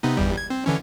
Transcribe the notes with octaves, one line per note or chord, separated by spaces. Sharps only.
C3 B3 D#4
G1 E2 G3
G#6
C4
D3 E3 C#4